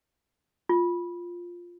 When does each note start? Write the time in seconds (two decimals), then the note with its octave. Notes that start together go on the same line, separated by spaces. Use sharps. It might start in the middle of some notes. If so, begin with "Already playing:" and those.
0.69 F4